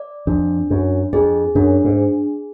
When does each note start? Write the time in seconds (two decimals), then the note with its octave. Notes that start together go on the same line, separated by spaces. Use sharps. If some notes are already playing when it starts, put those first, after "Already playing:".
Already playing: D5
0.27 F2 D4
0.70 F#2 D4
1.13 F2 G#4
1.55 F#2 D4
1.84 G#2
1.98 G#4